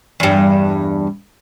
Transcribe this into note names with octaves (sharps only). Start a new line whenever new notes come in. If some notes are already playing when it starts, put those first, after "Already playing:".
E2 G2